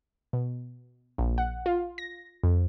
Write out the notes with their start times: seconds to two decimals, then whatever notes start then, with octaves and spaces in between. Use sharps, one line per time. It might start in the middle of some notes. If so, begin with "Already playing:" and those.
0.33 B2
1.18 A#1
1.38 F#5
1.66 F4
1.98 A#6
2.43 F2